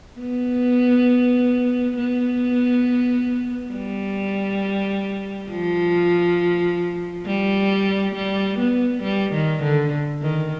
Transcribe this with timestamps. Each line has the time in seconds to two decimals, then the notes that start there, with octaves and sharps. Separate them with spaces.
0.19 B3
1.96 B3
3.73 G3
5.50 F3
7.26 G3
8.16 G3
8.59 B3
9.03 G3
9.33 D#3
9.63 D3
10.22 D#3